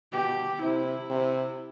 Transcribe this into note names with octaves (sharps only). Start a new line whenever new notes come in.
B2 G4
C3 E4
C3